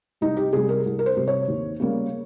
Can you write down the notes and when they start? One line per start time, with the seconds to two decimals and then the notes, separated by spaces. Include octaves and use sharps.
0.21 C2 D#4
0.37 G4
0.53 C3 G3 G#4
0.69 A#4
0.85 C2
0.99 A#4
1.06 C5
1.17 C3 G3
1.28 C#5
1.48 D#2
1.80 C#3 G3 A#3